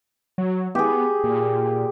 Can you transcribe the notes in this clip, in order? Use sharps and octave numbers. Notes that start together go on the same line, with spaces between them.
F#3
B3 G4 G#4
A#2